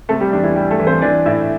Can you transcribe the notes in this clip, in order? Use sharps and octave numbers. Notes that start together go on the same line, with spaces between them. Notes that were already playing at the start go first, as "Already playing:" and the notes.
C3 A3 A4
G3 G4
E2 D4
E3 E4
G3 G4
A3 A4
E3
C4 C5
E3 D4 D5
A2 E4 E5